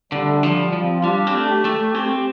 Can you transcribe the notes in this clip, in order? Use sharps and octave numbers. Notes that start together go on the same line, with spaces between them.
D3 G3
A3
G3
F3
G3
F3
C4
F4
G3 D4
C4
A3
G4
A3
C4 G4